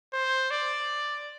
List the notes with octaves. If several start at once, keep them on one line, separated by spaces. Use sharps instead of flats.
C5
D5